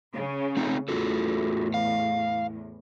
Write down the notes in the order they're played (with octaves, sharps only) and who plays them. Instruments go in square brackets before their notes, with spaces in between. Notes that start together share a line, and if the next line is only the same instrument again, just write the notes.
[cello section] C#3
[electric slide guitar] A3 C4 D#4
[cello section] E2 A2 [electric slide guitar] F4 F#4 A4
[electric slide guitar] F5